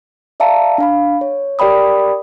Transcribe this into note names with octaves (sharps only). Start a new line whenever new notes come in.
D5 E5 F5 A5 A#5
D4 F5 B5
C#5
G4 A#4 D5 G5 B5 D#6